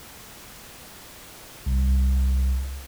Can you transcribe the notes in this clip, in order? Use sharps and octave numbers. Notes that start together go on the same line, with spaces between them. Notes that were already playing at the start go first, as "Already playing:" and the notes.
C2